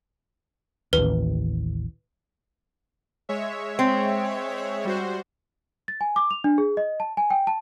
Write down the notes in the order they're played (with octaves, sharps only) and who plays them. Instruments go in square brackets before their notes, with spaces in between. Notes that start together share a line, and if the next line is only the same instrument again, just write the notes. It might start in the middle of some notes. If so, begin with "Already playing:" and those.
[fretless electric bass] A1 D#2 [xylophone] B4
[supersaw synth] G#3 C#5 E5
[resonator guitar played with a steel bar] C4
[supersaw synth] G3 F#4 C5
[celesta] A6
G#5
D6
F7
D4
G#4
D#5
A5
G#5
G5
A5